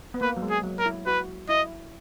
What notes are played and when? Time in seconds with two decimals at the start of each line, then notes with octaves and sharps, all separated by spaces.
0.14 B3
0.21 A#3 B4
0.37 F#3
0.42 G#3
0.50 G#4
0.64 F#3
0.79 A#4
0.85 E4
1.06 F#4 B4
1.49 E4 D#5